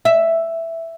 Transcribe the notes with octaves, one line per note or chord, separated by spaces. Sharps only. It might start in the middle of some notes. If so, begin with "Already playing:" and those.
E5